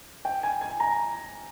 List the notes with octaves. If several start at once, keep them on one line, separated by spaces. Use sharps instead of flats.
G5
G#5
G#5
A#5